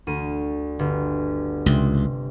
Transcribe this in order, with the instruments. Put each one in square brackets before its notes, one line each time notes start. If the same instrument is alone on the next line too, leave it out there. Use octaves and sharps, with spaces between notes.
[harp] D2 D#7
G1
[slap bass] C#2 [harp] C3